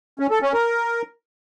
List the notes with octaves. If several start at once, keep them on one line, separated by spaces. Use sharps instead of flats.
C#4
A4
C#4
A#4